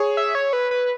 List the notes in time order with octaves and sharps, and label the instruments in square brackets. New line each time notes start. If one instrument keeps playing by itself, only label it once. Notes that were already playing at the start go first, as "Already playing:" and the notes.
Already playing: [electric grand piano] G#4 C#5
[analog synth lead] E5
C#5
B4
B4